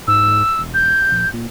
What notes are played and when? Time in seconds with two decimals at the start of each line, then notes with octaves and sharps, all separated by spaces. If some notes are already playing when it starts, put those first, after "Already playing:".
0.08 G#2 E6
0.59 E1
0.74 G6
1.12 A#1
1.33 A#2